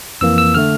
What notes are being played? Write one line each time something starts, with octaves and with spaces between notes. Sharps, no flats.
F2 E3 A#3 E6
E6
D3 A3 F6